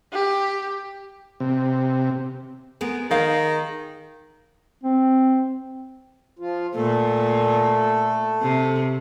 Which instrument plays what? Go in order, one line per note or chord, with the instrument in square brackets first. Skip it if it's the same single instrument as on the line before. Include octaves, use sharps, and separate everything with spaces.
[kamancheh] G4
[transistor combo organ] C3
[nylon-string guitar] G#3 B3 A#4
[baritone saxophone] D#3 [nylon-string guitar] G#4 F5
[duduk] C4
[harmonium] F3 F4
[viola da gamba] A#2 [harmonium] A3 A4
[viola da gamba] C3